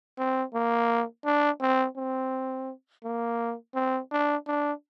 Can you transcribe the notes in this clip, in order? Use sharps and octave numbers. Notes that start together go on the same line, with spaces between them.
C4
A#3
D4
C4
C4
A#3
C4
D4
D4